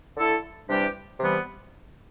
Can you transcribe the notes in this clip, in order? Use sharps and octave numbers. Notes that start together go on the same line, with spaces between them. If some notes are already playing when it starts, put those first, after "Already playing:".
D3 A3 E4 A4
C3 E3 G3 D4 G4
C3 E3 G3 B3